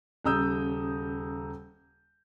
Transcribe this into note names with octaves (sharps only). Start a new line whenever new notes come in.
D#1 C#3 A#5 D#6 E6 G6